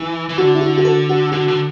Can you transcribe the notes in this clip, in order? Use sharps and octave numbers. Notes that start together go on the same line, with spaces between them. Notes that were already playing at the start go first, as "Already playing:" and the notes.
Already playing: E3
E3
D3 F#4
E4
F#4
F#4
A4
F#4
D3 F#4
D3